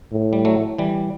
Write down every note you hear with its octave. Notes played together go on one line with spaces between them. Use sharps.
A2
G3
F#3 A3
E3 G3